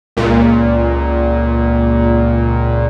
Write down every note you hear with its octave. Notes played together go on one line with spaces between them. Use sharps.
C#2 A#2